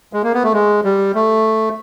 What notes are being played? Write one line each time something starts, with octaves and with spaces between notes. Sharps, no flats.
G#3
A#3
B3
A3
G#3
G3
A3